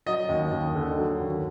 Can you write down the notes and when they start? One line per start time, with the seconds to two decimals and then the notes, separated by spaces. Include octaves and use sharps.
0.06 F#3 D#5
0.29 D#2
0.52 D#2
0.75 D3
0.97 F#3
1.20 D#2